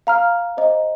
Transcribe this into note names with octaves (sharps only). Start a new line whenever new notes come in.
F5 A#5 F6
C5 D#5 A#5